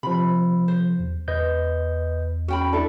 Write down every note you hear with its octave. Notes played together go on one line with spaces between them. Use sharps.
C3 F3 B5
C5
E2
E2 B4 D#5 G6
C#4 F#4 G5 B5
D4 E4 A4 E5